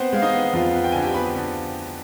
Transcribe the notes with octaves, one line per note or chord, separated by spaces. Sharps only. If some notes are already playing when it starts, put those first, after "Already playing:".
Already playing: B3 C4 C5
G#3 F5
D#4 D#5
B3
F2 F4 F5
B3
G5
D3 G#5
G4 G5
B3 B4 B5
D3